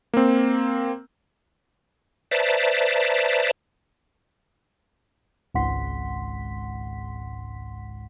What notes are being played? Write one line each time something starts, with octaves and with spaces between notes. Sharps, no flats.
A#3 C4
B4 C5 D5 E5 A5 A#5
G#1 C#2 G#2 F#5 C6 B6